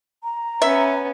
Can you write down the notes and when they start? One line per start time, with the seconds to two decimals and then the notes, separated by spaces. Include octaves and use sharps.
0.24 A#5
0.62 B3 C#4 E5